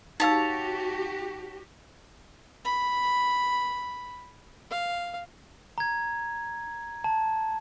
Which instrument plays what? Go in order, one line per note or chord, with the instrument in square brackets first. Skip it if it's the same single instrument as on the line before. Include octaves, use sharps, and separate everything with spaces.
[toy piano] D#4 F5 E6 [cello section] F#4 G4 [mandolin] C#5 A5
[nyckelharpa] B5
F5
[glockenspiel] A#5 G#6
A5